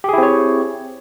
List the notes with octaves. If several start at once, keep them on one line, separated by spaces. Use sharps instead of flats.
C4 E4 G4 G#4 C#5